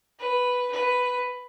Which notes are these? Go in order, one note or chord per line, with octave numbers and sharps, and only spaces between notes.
B4
B4